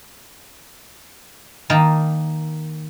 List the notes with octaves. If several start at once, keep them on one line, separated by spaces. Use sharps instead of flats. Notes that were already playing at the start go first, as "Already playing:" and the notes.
D#3 A#3 D#4 A5